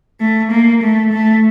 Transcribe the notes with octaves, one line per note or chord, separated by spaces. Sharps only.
A3
A#3
A3
A3